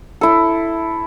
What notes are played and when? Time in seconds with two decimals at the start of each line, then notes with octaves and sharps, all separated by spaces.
0.21 E4 A4